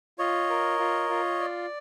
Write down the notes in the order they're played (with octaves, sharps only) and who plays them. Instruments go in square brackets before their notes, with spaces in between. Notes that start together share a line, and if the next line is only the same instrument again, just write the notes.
[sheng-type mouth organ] F4 [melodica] C#5 D#5
[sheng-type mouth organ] A#4
F4
F4
D5